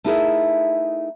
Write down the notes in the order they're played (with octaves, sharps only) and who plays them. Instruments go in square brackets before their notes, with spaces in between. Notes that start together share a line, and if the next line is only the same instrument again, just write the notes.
[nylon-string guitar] A3 D#4 E4 G#4 A#4